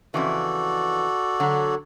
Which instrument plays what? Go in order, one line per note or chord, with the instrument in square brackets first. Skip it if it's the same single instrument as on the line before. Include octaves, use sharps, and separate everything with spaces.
[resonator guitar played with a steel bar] F2 C#3 E3 [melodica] F#4 A4 D5
[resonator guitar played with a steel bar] D3 F#3